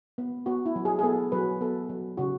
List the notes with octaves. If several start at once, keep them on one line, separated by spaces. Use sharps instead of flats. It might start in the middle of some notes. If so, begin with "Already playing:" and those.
B3
B3 F#4
E4
F#3
G#4
G#4
B3 A4
F#3 B4
B3 A4
F#3
C#3 F#4